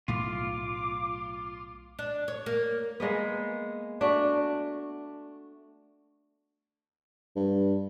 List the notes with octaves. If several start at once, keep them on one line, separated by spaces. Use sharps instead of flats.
B1 A2 A3 F4 D6
D4
C#5
A#3
G#3 A#3 B3
A3 D4 F#4
G2